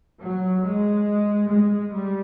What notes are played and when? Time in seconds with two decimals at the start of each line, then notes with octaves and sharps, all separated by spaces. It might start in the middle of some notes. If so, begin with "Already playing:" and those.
0.21 F#3
0.64 G#3
1.50 G#3
1.93 G3